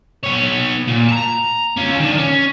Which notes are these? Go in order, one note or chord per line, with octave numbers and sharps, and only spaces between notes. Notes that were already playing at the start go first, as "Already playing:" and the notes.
B3 C#5
A#2
A5 A#5
C#4 F4
D#3 D4
C#4